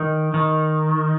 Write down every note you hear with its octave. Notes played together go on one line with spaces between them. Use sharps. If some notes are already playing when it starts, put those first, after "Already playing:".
Already playing: D#3
D#3